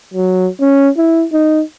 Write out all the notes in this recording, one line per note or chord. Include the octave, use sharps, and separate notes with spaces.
F#3
C#4
E4
D#4